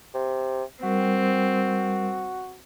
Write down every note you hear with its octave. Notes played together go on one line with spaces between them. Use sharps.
C3
G3 C4 F#4 A#4